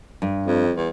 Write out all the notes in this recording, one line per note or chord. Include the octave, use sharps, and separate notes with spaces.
G2
F2
E2